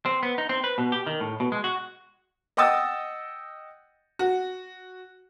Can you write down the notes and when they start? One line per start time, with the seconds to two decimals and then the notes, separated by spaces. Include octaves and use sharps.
0.06 C4
0.23 B3
0.38 D#4
0.49 C4
0.64 B4
0.78 B2
0.92 G4
1.07 D#3
1.20 A2
1.40 B2
1.52 G#3
1.64 F#4
2.57 D#5 F#5 G5 D#6 E6 A6
4.19 F#4